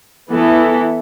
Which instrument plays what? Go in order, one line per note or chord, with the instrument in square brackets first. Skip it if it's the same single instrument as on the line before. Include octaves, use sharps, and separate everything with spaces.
[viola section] E3 B3 E4 A4